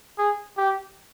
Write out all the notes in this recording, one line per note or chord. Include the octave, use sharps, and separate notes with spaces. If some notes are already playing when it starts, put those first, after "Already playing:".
G#4
G4